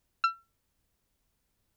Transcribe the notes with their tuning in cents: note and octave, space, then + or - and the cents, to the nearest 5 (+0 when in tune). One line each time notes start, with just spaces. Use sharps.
E6 +40